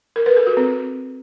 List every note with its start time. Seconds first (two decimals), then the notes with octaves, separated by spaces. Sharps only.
0.16 A#4
0.26 B4
0.36 A4
0.47 F#4
0.57 C4